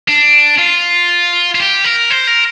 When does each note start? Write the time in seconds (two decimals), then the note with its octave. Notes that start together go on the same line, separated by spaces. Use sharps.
0.08 D4
0.58 F4
1.55 F4
1.60 G4
1.84 A#4
2.10 C5
2.27 A#4